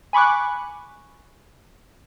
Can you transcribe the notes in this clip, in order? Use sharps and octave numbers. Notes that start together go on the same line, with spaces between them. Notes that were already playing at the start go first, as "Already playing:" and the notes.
G#5 B5 C#6 D6 F#6